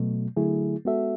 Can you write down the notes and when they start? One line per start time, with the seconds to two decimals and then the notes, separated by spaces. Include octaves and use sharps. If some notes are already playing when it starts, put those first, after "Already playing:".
Already playing: B2 F#3 A3
0.37 D3 F#3 A3 E4 G#4
0.85 G#3 B3 F#4 A4 E5